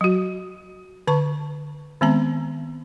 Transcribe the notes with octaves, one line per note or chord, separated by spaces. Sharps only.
F#3 F#4
D3 B4 A5 C#6
D#3 G#3 B3 C4 A#5